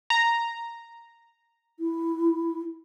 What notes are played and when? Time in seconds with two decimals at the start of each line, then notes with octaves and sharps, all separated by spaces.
0.10 A#5
1.80 E4